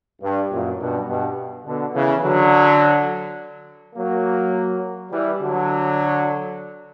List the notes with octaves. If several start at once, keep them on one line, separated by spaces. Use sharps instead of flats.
G2
F#2 A#2
G2 B2
G2 B2
B2 D3
C#3 E3
D3 F#3
F#3 A#3
E3 G3
D3 F#3